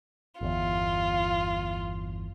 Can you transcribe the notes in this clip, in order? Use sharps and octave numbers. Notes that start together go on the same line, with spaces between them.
G1 E2 F4